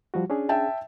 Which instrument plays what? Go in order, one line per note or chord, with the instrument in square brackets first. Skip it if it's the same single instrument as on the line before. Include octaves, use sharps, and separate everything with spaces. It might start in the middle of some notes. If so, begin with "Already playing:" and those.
[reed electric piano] F3 G3 F#4
C#4 D4 G#4
[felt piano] E5 G5 A5